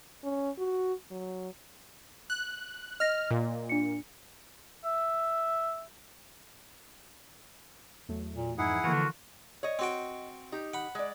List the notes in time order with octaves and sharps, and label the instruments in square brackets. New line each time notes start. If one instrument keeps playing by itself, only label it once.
[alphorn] C#4
F#4
F#3
[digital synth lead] F#6
[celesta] D#5 A#6 [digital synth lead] F6
[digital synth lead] A#2
[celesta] D4 C#7
[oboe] E5
[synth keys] E2 F#3 A3
[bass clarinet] A#2
[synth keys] F2 G#2 E3 [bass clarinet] D#4 [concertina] E4 G#4 F#5
[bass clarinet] D3 [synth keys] E3 F3 A#3 [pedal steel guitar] F4 F#4
[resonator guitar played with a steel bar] C#5 D#5
[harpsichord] C4 F#4 G5
[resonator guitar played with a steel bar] D#4 G4
[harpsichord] F#5 B5
[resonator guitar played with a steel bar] G#3 D5